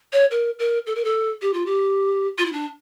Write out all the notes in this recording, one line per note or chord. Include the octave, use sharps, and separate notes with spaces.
C#5
A#4
A#4
A4
A#4
A4
G4
F4
G4
F4
E4
D4